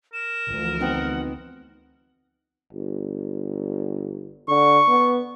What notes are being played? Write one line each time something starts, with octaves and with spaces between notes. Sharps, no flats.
A#4 E7
D2 E3 F3
B3 C4 D#4 F#5
G1
D3 C#6
B3